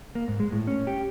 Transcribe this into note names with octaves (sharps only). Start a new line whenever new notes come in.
A#3
G#2
G#3
A2
C#4
G4